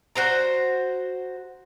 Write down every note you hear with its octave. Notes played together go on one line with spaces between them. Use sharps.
F#4 C5 A#5